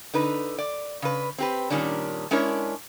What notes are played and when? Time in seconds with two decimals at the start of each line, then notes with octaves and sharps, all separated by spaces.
0.14 D3 D#4 B4
0.59 D5
1.02 C#3 B4
1.38 C4 G4 B4
1.70 A#2 D#3 G3 C#4 D4
2.31 G#3 C#4 D4 E4 A#4 C#5